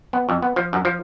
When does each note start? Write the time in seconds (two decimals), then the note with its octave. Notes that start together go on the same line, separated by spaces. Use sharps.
0.13 B3
0.29 F2
0.42 B3
0.56 F3
0.73 F#2
0.85 F3